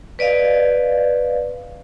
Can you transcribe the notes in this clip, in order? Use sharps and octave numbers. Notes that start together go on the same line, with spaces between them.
B4 D5 D#5 F5